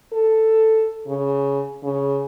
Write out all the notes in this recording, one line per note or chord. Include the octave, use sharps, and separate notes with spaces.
A4
C#3
C#3